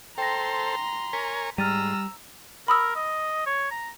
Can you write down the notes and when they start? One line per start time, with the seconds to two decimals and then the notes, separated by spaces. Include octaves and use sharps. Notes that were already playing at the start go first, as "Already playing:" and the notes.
0.18 A4 C5 G5 A#5 C6 A#6
1.13 A#4 C#5 G#5 B6
1.58 G#2 G3 A#5 E6 F6 A6 D#7
2.68 A#4 B5 D#6 E6
2.96 D#5
3.46 C#5
3.71 A#5